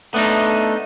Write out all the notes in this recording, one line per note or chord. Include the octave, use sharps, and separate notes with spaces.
A3 B3 D4 D#4